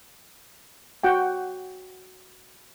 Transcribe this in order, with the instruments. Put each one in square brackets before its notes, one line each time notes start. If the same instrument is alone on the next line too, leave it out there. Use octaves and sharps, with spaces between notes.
[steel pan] F#4 F#5 G5